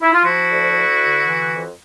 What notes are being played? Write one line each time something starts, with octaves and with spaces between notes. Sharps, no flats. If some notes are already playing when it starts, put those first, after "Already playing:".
E4
F4
F3 E4 F#4
D2
D2
D3
E3
F2